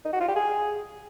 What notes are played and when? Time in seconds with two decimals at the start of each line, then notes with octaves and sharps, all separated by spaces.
0.05 D#4
0.13 F#4
0.20 F4
0.28 G4
0.36 G#4